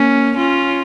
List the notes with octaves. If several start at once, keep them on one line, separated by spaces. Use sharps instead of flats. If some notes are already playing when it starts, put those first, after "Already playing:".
Already playing: A#3 C#4
C#4 F4